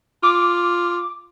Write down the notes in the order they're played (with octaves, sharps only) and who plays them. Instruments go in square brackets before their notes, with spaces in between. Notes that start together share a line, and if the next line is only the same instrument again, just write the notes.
[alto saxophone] F4 [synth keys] D6